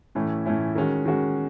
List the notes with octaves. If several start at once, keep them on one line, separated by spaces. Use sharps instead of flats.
A2 E3 A3 C#4 E4
A2 E3 A3 C#4 E4
D#3 G#3 C#4 F#4
D#3 G#3 C#4 F#4